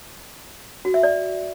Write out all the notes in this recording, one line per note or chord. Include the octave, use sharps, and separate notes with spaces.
F#4
E5
D5